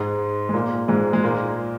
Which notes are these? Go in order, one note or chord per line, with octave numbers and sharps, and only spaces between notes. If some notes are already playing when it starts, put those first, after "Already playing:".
Already playing: G#2 G#3
G#3
A#2 A#3
G#2 G#3
G#3
A#2 A#3